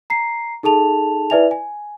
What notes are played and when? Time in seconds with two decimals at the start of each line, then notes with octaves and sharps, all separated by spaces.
0.10 A#5 C7
0.63 D#4 G#4 A4 A5 F7
1.30 E4 B4 D5 E5 G#5 F7
1.51 G#5